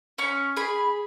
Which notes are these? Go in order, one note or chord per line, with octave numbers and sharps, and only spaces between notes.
C#4 C#6
G#4 B5